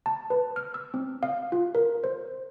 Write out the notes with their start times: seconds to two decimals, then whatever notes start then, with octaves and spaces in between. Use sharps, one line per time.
0.06 A5
0.30 B4
0.56 F6
0.74 E6
0.94 C4
1.23 F5
1.52 F4
1.75 A#4
2.04 C5